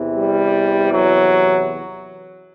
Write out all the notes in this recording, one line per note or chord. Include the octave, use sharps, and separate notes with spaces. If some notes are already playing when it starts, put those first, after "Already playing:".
Already playing: E2 C3 E3
G3
F#3